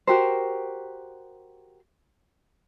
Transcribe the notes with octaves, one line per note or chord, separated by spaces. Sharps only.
F#4 G4 A#4 C5